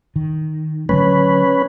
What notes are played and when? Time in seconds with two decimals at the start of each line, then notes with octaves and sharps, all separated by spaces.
0.16 D#3
0.89 D3 F#3 A3 C#4 B4